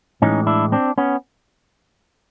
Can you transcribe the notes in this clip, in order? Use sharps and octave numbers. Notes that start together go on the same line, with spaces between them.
A2 E3 G#3 C#4 D#4
D4 E4
C4 D4
B3 C#4